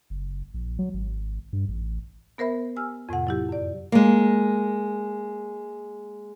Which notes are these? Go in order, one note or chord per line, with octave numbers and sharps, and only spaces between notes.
F#1
A#1
F#3
G#1
G2
A1
B3 A#4 C5 E5 B5
G4 G#5 E6 F6
F2 A2 C3 F#5
F#3 E4 G4
F#2 D5
G#3 A#3